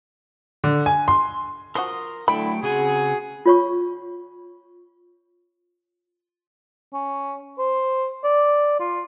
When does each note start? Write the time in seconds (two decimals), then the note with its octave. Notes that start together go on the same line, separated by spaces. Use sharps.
0.64 D3
0.86 G#5
1.08 C6
1.75 F3 F#4 A#4 C6 D#6
2.28 D3 F#3 A3 E4 G5 B5
2.63 C#3 C4 F#4 G#4 F#5
3.46 F4 C#5 C#6
6.94 C#4
7.59 C5
8.24 D5
8.80 F4